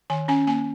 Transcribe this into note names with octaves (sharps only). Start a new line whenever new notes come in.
D#3 G#5
C#4 G#5
A#3 G#5